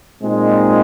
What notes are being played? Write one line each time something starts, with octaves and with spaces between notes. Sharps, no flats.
A#2 G#3 C4 D#4